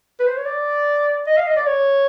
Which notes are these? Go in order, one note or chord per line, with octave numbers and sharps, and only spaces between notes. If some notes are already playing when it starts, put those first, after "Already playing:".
B4
C5
C#5
D5
D#5
F5
D#5
D5
C#5